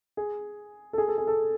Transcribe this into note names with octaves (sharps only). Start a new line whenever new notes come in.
G#4
A4
G#4
A4
G#4
A4